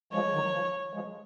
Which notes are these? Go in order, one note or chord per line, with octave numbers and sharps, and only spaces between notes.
F3 G#3 C#5
D#3 F#3
F3
F3 G#3